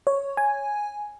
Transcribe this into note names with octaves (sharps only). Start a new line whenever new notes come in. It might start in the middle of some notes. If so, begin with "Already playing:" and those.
C#5
G#5